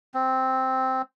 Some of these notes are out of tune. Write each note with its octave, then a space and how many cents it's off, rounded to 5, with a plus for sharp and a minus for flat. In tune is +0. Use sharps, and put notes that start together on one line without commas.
C4 +0